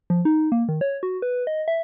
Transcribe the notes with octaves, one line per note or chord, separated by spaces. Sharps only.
F3
D#4
A#3
D#3
C#5
F#4
B4
D#5
E5